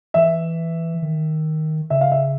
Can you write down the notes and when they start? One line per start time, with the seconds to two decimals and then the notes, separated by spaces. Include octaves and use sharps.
0.14 E3 E5
1.02 D#3
1.90 C#3 E5
2.01 F5
2.12 E5